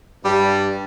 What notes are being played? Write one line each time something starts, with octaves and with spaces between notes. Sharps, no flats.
G2 G3